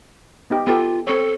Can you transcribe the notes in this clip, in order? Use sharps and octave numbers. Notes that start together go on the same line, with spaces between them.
B3 D#4 G4
B3 F4 G4 A4
C4 A4 C#5